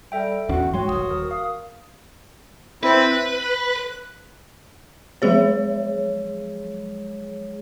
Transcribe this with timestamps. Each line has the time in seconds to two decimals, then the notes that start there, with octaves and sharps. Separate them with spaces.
0.12 G3 A4 E5 G5
0.49 D1 E2 C#4 F#4 F#5
0.74 G#2 F#3 G#3 F#4 C#5 G5 C6
0.88 D#1 G#1 D#6
1.11 A#4
1.31 F5
2.83 C4 E4 B4
3.11 F#6
5.22 F3 F#3 G#3 G#4 C#5